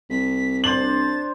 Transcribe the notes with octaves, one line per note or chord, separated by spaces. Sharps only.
C2 B6
D4 C5 A6 F#7